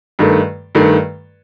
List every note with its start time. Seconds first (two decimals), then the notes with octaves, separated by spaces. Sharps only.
0.19 G2 D#3 A3
0.75 G2 D#3 A3